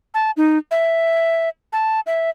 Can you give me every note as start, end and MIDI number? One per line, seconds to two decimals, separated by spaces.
0.14 0.31 81
0.37 0.58 63
0.71 1.49 76
1.73 2.00 81
2.07 2.30 76